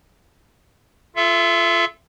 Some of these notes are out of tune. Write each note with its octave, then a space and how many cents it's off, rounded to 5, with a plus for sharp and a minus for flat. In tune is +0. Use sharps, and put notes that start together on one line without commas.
F4 -15 A4 -15 E5 +25